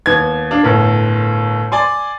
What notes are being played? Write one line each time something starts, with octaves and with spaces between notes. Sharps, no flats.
D#2 B3 G#6
D4 F5
G1 A2 A#4
D5 G#5 C6